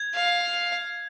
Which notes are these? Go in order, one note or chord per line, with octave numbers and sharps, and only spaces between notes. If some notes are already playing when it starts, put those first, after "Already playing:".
Already playing: G#6
F5